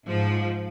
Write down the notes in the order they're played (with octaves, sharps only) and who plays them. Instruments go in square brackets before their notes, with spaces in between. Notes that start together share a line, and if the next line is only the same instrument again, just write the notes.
[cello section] G#2 F3